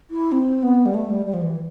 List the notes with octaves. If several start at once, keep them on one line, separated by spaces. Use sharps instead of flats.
E4
C4
B3
G3
A3
G3
G3
F3
E3